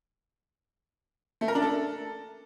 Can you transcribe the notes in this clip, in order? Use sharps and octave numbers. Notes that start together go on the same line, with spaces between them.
A3
A#4
D4
A4